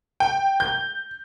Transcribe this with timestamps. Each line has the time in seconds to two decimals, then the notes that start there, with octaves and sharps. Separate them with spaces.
0.20 G5
0.60 G6